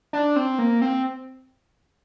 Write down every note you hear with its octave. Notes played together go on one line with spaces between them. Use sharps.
D4
C4
A#3
C4